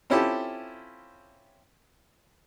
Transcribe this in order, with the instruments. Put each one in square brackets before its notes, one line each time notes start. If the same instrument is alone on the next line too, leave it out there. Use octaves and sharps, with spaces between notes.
[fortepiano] C4 C#4 E4 F4 G4 A4